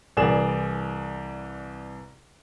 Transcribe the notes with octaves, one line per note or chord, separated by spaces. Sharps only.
C2 E3 G#4 D5 E7